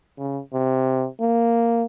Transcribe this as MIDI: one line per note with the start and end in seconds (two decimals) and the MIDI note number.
0.18 0.41 49
0.53 1.08 48
1.20 1.85 58